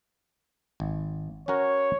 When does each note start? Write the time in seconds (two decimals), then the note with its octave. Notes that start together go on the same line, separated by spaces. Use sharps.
0.80 G#1
1.48 C#4 F#4 A#4 C#5